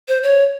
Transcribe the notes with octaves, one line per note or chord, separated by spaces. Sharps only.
C5
C#5